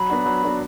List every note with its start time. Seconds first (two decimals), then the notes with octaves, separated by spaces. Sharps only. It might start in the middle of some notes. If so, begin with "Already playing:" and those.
Already playing: F#3 B5
0.09 B3 D4 F#4
0.26 F#3
0.43 B3 D4 F#4